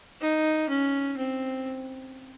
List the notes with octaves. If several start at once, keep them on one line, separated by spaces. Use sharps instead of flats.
D#4
C#4
C4